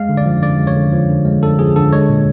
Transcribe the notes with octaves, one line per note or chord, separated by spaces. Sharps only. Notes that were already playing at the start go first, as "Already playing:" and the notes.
Already playing: G#3 F5
D3
D5
F3
D3 D5
G#3
C#5
D3
F3
D3
G#3
D3 A4
F3 G#4
D3 A4
G#3 C#5
A#2